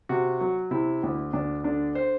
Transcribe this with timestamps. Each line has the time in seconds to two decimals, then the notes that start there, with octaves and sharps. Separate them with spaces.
0.09 C3 F#4
0.41 F#3
0.71 C3 E4
1.03 D2
1.33 D2 D4
1.64 D3 D4
1.95 C5